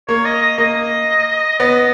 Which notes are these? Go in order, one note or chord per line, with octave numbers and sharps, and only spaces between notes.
A#3 C#5
D#5
D#5
A#3 D#5
B3 D#5